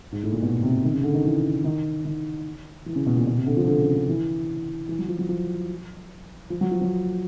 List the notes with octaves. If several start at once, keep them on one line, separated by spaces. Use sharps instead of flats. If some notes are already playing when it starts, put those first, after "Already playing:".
G#2
A2
A#2
B2
C3
D#3
C#3
D3
D#3
E3
D#3
D#3
E3
C#3
B2
A#2
B2
C3
D3
F3
D3
C#3
D3
E3
E3
F#3
F3
F#3
F3
F3
F#3
F3
F#3